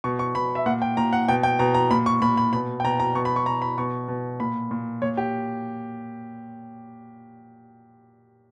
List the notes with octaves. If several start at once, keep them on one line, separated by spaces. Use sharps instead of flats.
B2 C#6
C#6
B2 B5
E5
A#2 F#5
G5
A#2 A#5
F#5
B2 G5
G5
B2 A#5
A#5
A#2 B5
C#6
A#2 B5
B5
B2 B5
G5
B2 A#5
A#5
B2 C#6
B5
C#6
B2 A#5
B5
B2 C#6
B2
A#2 B5
A#2
A#2 C#5
G4